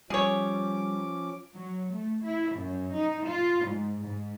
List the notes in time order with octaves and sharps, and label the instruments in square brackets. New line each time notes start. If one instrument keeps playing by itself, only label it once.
[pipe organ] F3 C#4 D6 [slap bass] G3 [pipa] G#4 C#5
[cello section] F#3
A3
E4
F#2
D#4
F4
G#2
G#2